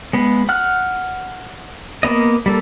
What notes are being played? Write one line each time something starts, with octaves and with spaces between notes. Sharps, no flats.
G#3 B3
F#5 F6 F#6
A#3 B3 D#5
G3 A#3 A4